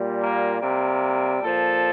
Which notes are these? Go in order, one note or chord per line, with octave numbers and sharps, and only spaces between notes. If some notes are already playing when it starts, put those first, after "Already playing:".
Already playing: A#2 G3
A#3
C3 G3 A#3
A#2 F3 A4